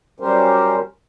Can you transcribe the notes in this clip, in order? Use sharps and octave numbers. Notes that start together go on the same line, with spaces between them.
F#3 G3 C#4 G4 A#4 C5